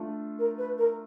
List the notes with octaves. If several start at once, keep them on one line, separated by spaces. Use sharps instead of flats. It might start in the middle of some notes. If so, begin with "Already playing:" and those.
Already playing: A3 D4 F4
A#4
B4
A#4